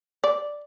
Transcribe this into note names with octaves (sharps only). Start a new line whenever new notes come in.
D5